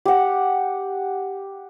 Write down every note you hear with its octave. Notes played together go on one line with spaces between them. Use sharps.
G4 F#5